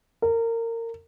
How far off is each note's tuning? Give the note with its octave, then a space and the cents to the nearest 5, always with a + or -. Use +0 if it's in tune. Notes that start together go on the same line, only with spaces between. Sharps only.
A#4 -25